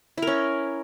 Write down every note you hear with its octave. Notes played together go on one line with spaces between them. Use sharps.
C#4 E4 A#4